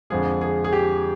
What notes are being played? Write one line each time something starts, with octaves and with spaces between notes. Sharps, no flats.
F2 D3 F3 G#3 G#4
G#4
G#4
G4